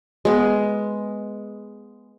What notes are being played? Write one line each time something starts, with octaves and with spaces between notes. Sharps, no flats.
G#3 B3